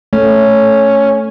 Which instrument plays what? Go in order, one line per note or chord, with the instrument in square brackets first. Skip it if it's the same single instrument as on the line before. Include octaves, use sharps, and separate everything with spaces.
[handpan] A3 [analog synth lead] C#4